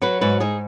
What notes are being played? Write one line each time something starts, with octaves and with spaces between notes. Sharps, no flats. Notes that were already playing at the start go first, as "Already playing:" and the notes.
F#3 F#4 B4
G#2 F#4 B4
G#2 D#4 G#4